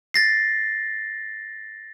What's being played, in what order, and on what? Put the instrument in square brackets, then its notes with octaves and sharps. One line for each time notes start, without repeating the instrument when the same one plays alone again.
[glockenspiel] A6 A#6 C7